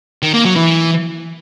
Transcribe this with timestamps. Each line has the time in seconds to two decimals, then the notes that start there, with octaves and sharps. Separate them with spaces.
0.23 D#3
0.34 A#3
0.45 F#3
0.57 E3